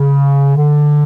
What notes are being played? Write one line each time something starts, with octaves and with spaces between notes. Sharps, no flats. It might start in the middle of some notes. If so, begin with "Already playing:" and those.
Already playing: C#3
D3